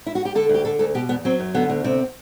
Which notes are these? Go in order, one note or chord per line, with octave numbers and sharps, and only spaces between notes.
E4
F#4
G4
D3 A4
D2 G4
D3 A4
D2 A4
B2 G4
E2 B3
F#3 C4
F#2
D3 B3
D2
C3 C4